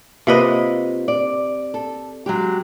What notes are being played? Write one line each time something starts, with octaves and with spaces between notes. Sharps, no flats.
C3 A#3 F4 B4 D#5
D5
A4
F#3 G#3 G4